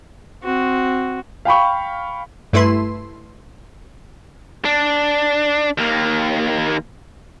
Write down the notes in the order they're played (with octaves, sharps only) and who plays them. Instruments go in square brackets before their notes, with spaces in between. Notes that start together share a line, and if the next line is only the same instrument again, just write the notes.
[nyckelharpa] C4 F#4
[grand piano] F5 G5 B5 C#6
[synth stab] G2 A3 E4 B4 C6
[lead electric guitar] D4
D#2 A#3